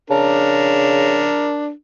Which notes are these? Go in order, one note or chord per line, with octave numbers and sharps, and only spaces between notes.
C#3 D4 A#4